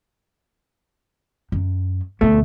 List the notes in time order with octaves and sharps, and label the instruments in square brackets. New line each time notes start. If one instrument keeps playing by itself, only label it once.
[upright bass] F#2
[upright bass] D2 B2 [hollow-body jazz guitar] A3